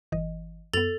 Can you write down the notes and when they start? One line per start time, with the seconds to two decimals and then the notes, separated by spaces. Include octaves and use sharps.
0.12 G1 E3 D#5
0.73 F#2 B3 A4 A6 F7